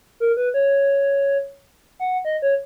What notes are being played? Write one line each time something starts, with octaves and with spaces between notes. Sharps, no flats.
A#4
B4
C#5
F#5
D#5
C#5